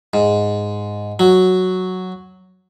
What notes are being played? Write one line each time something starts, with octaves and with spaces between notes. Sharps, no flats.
G#2
F#3